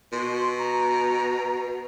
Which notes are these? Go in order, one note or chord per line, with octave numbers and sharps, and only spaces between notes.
B2 C6
A#5